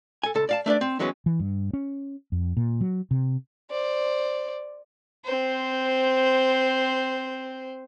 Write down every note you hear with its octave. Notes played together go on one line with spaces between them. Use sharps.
A4 G#5
C#2 A4
D5 F5 A5
A3 D4 B4 D5
C4
E3 F#3 G#3 B3 C#4
E3
G2
C#4
F2
A#2
F#3
C3
C5 D5
C4 C5